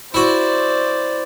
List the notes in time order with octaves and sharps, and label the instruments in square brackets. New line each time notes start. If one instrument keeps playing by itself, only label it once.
[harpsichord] E4 F#4 [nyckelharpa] C5 D5